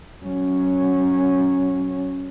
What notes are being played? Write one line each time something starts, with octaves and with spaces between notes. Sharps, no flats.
F#3 C#4